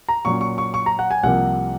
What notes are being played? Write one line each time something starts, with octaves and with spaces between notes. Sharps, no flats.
A#5
A#2 F#3 C#4 C#6
C#6
C#6
C#6
A#5
F#5
G#5
C2 C3 F3 A#3 F#5